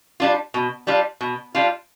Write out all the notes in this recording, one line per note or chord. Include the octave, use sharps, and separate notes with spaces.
G3 D4 F4
B2
G3 D4 F4
B2
G3 D4 F4